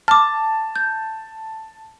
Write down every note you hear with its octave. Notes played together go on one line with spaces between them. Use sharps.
A5 D6 F6
G6